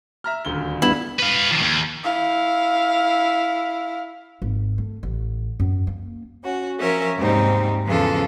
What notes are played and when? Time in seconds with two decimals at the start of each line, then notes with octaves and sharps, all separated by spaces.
0.24 E5 A#5 F6
0.45 D#1 D2 G7
0.82 G2 B3 E4
1.19 B4 F5
1.51 D#3 F3
1.63 D#2
2.04 E4 F5
4.42 G#1
4.78 A3
5.03 A1
5.60 F#2
5.87 A#3
6.42 C#4 F#4
6.79 F3 C#4 A#4 E5
7.16 D#2 G#2 C3 G3 C4 D#4
7.86 E2 C#3 F3 B3 F4 A4